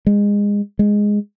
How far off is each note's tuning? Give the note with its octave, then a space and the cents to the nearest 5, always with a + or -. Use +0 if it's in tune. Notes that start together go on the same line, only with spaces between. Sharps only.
G#3 -25
G#3 -5